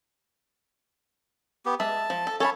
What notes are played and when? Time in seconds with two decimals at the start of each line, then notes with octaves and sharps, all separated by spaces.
1.66 B3 G4
1.80 G#3 E5 A5
2.10 F3
2.27 A4
2.40 C#4 A4 C#5 A5 B5